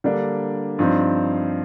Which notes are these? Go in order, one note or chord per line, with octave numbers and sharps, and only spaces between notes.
D3 G3 A#3 D4
G2 F3 C4 D#4